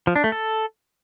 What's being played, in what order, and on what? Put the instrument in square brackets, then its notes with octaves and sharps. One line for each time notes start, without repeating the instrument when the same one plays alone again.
[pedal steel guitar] F3
D4
A3
A4